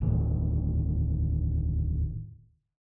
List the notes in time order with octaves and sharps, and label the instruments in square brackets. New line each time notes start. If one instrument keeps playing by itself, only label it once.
[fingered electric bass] E1 D2 A2 D#3